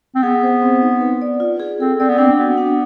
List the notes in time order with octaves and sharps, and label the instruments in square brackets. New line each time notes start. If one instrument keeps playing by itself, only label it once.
[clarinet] C4
[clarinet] B3 [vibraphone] G#4
[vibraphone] C5
C4
D#4
B4
D5
F4
G#4
[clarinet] C4 [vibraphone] A4
[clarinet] C4 [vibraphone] D5
[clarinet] B3
[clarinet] C4 [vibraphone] D4
[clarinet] B3 [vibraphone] F#4
[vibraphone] D4